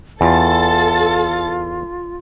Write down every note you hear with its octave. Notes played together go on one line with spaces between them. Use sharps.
E2 F4 A4 A6